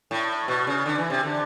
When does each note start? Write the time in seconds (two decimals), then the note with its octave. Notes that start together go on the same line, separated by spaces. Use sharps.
0.11 A2
0.48 B2
0.67 C#3
0.86 D3
0.98 E3
1.10 C3
1.23 D3